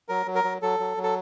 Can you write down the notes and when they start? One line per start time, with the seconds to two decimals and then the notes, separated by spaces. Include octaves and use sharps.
0.09 F#3 A#4
0.26 F#3
0.35 A#4
0.44 F#3
0.62 F#3 A4
0.79 F#3
0.97 F#3
1.03 A4